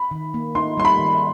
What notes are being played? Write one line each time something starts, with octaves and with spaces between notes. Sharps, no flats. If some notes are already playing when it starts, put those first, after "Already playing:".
Already playing: B5
D#3
A#3
D#4 C6
G3 C6
B5
D#3